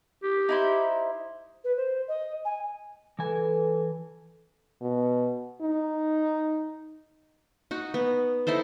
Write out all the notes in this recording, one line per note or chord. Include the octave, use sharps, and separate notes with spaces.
G4
D#4 E4 C5
B4
C5
D#5
G#5
E3 A4 B4 G#5
B2
D#4
D#4 F#4
B3
D#4 E4 A4 C5